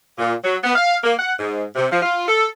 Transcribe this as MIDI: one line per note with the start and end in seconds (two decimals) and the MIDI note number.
0.18 0.33 46
0.43 0.56 54
0.63 0.71 59
0.75 0.96 77
1.04 1.13 58
1.19 1.32 78
1.39 1.63 44
1.75 1.85 48
1.90 2.02 53
2.02 2.24 65
2.27 2.46 69